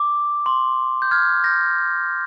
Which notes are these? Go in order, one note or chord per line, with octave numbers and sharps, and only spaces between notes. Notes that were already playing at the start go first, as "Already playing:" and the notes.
Already playing: D6
C6
G6
F6 G#6
G6 A#6